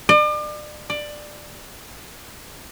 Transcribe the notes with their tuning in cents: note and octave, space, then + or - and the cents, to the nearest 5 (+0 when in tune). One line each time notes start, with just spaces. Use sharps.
D5 +40
D5 +15